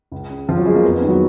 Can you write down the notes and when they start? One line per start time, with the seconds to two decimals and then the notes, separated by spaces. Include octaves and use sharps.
0.12 C#2
0.30 C#3
0.48 C#2 F3 F4
0.57 F#3 F#4
0.65 C#3 G#3 G#4
0.75 A#3
0.84 F2 B3
0.96 B3
1.02 D#3
1.07 F#3 F#4